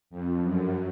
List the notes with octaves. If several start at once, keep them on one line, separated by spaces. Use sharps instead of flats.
F2
F#2